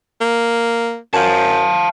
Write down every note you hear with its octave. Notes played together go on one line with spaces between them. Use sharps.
A#3
F#2 F5 A5